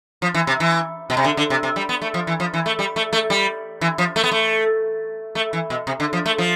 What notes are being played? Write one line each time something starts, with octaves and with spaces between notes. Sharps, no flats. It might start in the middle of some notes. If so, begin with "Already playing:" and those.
F3
E3
C3
E3
B2
C3
D3
D3
C3
C3
G3
B3
A3
F3
E3
F3
E3
A3
G3
A3
A3
G3
E3
F3
A3
B3
A3
A3
E3
B2
C3
D3
F3
A3
F3